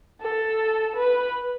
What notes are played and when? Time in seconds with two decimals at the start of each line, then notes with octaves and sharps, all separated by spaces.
0.21 A4
0.95 B4